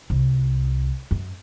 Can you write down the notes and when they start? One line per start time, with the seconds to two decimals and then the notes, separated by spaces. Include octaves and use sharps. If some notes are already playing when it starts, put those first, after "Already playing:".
0.10 C2
1.11 F#2